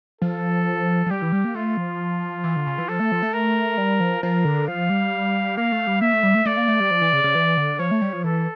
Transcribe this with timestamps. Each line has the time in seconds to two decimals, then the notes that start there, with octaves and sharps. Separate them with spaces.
0.21 F3 A4
1.06 F3
1.10 G3 G4
1.22 E3
1.32 G3
1.44 A#3
1.55 A3 F4
1.77 F3
2.44 E3
2.56 D3
2.66 C#3
2.78 E3
2.89 F3 A4
3.00 A3
3.12 F3
3.23 A3
3.33 A#4
3.78 G3
4.00 F3
4.23 F3 A#4
4.45 D3
4.67 F3 F5
4.90 G3
5.57 A#3 F5
5.72 A3
5.87 G3
6.01 A#3 E5
6.13 A3
6.23 G3
6.34 A3
6.45 A3 D5
6.57 A#3
6.68 A3
6.80 G3
6.91 F3
7.01 E3
7.13 C#3
7.24 C#3
7.35 E3
7.57 D3
7.79 F3 C#5
7.91 A3
8.01 G3
8.13 F3
8.24 E3 A4